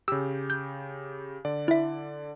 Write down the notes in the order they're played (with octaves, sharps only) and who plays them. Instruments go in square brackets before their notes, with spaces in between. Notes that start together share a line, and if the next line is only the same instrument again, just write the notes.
[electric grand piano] C#3 G4 [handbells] E6
[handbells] G6
[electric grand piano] D3 D5
[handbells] E4 E5